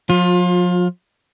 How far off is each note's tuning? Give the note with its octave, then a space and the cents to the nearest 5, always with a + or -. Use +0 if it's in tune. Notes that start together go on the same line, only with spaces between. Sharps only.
F3 +45 F4 +25